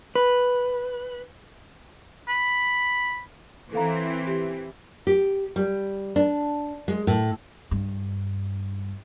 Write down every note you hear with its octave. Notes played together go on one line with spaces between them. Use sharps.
B4
B5
E3 C4 A4 F5 A#5
G4
G4
G3
D4
G#3
A2
G2